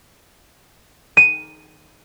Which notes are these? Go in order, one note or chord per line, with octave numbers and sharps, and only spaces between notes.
D#7